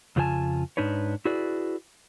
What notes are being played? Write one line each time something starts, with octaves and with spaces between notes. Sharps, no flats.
F2 C#3 F4 C5 G#5 A5
G#2 D4 D#4 B4 C#5
E4 F#4 G#4 B4 D5